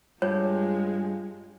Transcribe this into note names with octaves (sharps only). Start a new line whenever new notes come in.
G2 G#3 F4 C#5